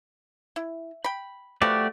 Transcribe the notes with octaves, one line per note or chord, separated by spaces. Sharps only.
E4
G5 B5
F3 A3 B3 F#4 G4 D5